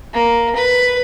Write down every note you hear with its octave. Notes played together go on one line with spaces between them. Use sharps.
A#3
B4